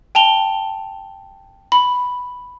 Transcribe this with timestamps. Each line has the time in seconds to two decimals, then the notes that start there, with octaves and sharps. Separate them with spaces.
0.15 G5 A5 F7 G7
1.72 B5